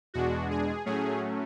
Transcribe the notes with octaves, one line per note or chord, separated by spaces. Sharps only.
E2 B2 G#3 D4 F#4
G#4
A2 F#3 A3 C#4 G#4